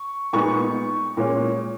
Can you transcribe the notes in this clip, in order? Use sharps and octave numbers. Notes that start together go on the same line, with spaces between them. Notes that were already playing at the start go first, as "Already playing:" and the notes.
Already playing: C#6
A#2 G#3 B3 D#4 C#6
A#2 G#3 C#4